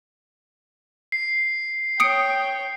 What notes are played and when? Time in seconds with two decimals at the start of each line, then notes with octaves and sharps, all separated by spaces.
1.12 C7
2.00 C#5 G5 D#6 C#7 D7